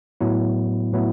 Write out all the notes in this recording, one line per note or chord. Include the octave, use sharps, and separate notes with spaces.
A2 F#3 B3 E4
A2 F#3 B3 E4